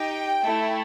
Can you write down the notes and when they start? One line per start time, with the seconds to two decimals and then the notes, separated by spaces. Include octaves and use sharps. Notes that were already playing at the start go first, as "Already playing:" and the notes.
Already playing: D#4 G4 G5
0.42 A3 E4 A4